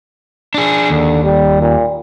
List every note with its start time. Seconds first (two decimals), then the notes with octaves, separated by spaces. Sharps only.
0.54 D4 G#4
0.90 D#2 D3
1.24 G3
1.62 A#2